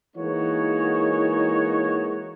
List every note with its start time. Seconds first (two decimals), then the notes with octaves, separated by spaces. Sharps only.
0.16 E3 G#3 A#3 D#4 F#4 C#5